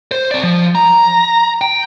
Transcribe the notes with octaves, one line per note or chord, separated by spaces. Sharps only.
C5
C4 D5
F3
A#5
G5